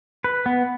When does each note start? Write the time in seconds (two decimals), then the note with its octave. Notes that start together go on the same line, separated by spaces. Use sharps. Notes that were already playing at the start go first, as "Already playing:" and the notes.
0.24 B4
0.46 B3